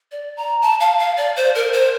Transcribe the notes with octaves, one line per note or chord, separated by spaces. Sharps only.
D5
A#5
A5
F5
F5
D5
C5
A#4
C5